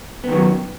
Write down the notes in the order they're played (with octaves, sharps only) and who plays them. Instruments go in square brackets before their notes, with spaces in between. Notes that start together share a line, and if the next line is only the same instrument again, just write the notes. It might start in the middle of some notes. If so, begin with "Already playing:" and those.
[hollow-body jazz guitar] B3
D#3
F#3